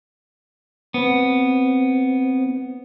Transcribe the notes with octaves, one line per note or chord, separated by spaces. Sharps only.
B3 C4